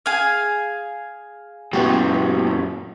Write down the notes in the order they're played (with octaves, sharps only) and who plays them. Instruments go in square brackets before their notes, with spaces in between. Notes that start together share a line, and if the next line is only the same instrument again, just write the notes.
[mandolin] G#4 F5
[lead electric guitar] F#2 A#2 [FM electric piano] B3 F#4 G4